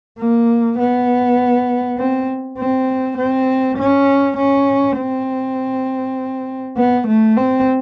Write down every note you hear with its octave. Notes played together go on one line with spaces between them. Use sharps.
A#3
B3
C4
C4
C4
C#4
C#4
C4
B3
A3
C4